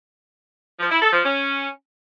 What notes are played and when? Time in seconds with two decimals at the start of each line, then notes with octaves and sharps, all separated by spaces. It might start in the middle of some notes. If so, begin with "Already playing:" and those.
0.80 F3
0.91 E4
1.02 A4
1.13 F3
1.24 C#4